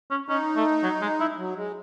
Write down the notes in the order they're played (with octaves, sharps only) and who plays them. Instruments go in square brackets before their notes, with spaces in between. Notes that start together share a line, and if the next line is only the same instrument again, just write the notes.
[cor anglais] C#4
[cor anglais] C#4 [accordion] D#4
[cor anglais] A3
F#3
G#3
E4
[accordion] F#3
G#3